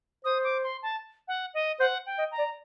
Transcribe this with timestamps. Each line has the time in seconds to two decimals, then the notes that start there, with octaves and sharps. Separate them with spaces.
0.24 C5 D#6
0.44 D6
0.63 C6
0.83 A5
1.28 F#5
1.54 D#5
1.79 C5 F#5
2.06 G5
2.18 D#5
2.31 A#5
2.38 D5